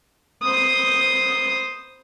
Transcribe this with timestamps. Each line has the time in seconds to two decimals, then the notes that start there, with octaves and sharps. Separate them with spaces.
0.43 C5 D#6